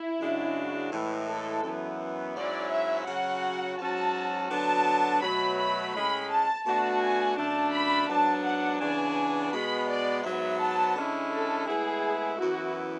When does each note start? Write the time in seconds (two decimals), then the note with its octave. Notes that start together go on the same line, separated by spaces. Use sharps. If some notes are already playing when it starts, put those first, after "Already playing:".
Already playing: E4
0.20 F#2 C#3 G#3 D4 F#4
0.92 A2 E3 G#3
1.28 A4
1.64 F#2 E3 B3
2.35 G#2 F#3 C#4 E4 D5
2.71 E5
3.07 C#3 F#3 C#4 F#4 F#5
3.78 G#2 F#3 C#4 F#4 A5
4.50 D3 F#3 B3 D4 F#4 A5
5.22 B2 F#3 A3 B5
5.58 B5
5.94 A2 G#3 C#4 B5
6.30 A5
6.65 B2 A3 D4 F#4 A5
7.01 G#5
7.37 F#2 D3 A3 D4 A5
7.73 B5
8.09 G#2 F#3 B3 D4 A5
8.45 F#5
8.80 C#3 E3 B3 D4 G#5
9.52 B2 G#3 B3 B5
9.88 D5
10.24 G#2 F#3 B3 E5
10.59 A5
10.95 D3 G#3 C#4 E4
11.32 A4
11.67 A2 G#3 B3 E4 G#4
12.39 F#2 E3 B3 E4 F#4